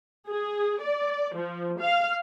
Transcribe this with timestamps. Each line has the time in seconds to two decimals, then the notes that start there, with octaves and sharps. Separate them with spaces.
0.27 G#4
0.81 D5
1.35 F3
1.79 F5